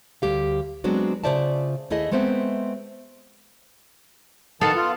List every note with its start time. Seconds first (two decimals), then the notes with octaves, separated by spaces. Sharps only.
0.22 D2 G3 G4 F5
0.84 F#3 G#3 B3 C4 D4 F#4
1.24 C#3 F4 C5 D5 E5 A5
1.90 D#2 A3 E4 G#4 D#5
2.11 G#3 A3 B3 C4 C5 E5
4.61 D#3 B3 A4 F5 A5
4.76 F4